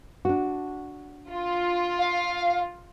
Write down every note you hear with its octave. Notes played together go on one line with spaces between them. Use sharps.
D4 F#4
F4
F5